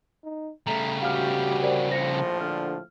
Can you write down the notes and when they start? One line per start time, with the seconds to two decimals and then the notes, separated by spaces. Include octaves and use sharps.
0.24 D#4
0.67 C#3 G3 A3 A#5
1.02 D2 F#4 G4 F5 F6
1.62 A#4 C5 D5
1.91 A#1 A2 F3 C5 A#6 C#7
2.40 D3 F6